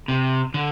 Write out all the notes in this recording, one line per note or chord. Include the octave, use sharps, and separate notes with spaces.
C3
D3